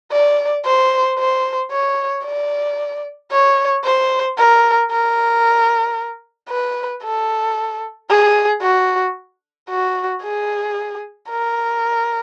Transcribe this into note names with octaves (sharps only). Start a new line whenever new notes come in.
D5
C5
C5
C#5
D5
C#5
C5
A#4
A#4
B4
A4
G#4
F#4
F#4
G#4
A#4